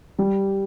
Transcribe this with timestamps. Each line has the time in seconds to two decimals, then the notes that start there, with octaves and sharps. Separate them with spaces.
0.19 G3